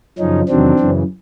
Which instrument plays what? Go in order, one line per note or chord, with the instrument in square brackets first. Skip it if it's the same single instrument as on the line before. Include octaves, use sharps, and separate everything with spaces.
[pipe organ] F#2 C#3 F3 C#4 D#4
E2 C3 D#3 F#3 C4 D4
F#2 C#3 E3